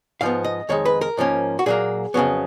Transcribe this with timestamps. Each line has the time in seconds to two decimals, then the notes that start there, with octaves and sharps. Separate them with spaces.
0.21 G#2 F3 B3 F5
0.44 D#5
0.69 F2 D#3 G#3 C#5
0.85 B4
1.01 A#4
1.17 G#2 F3 A#3 C#4
1.59 F#4
1.66 A#2 F#3 A#3 G#4
2.14 F2 C#3 F#3 B3